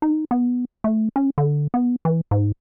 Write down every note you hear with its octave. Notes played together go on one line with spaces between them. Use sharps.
D#4
B3
A3
C#4
D3
B3
E3
G#2